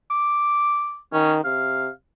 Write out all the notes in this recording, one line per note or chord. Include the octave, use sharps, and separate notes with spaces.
D6
D#3 C#4
C3 F5